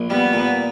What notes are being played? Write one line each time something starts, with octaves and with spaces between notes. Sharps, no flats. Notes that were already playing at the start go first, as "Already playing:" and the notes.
Already playing: A#1
G3 B3
A#2